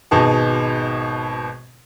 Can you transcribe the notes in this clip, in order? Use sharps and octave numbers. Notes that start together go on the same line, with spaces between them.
G#1 B2 D#4 G#4 A5